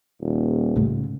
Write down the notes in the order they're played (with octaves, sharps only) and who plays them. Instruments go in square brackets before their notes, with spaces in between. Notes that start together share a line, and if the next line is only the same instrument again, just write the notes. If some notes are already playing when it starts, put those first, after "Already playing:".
[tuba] D#1
[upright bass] A2 C#3